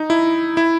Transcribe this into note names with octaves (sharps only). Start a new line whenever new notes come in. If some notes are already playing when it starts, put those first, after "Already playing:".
Already playing: D#4
E4
E4